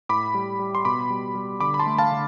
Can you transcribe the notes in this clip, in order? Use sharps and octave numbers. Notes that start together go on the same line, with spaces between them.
A2 B5 D6
G3
G3
C6
B2 B5 D6
G3
G3
D3 B5 D6
B5
A5 C6
A3
F5 A5
D3